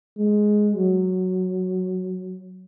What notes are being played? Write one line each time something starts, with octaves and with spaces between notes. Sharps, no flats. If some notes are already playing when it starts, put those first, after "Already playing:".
G#3
F#3